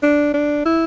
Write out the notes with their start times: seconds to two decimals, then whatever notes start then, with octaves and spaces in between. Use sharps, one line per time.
0.03 D4
0.34 D4
0.65 E4